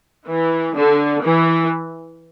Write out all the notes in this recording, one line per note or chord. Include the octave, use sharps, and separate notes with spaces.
E3
D3
E3